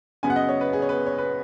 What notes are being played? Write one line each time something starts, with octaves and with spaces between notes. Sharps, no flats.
F#2 C#3 B3 G#5
F#5
D#5
C#5
B4
G#4
C#5
B4
C#5
B4